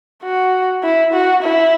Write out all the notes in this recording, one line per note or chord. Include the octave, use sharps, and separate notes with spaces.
F#4
E4
F#4
E4